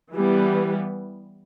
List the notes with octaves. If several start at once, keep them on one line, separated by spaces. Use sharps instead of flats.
E3 G3 B3